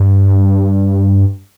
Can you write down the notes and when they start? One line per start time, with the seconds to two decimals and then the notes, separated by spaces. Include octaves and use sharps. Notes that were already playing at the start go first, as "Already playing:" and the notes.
Already playing: G2